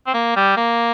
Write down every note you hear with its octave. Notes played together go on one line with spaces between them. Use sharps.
C4
A#3
G3
A#3